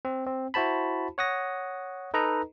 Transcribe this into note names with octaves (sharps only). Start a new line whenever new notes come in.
C4
C4
E4 F#4 C5 A5 B5
C#5 F#5 D#6 A#6
D#4 A4 B4 D#5 A#5